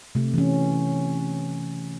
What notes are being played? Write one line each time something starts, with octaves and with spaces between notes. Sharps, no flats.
C3 A3
E3 C#4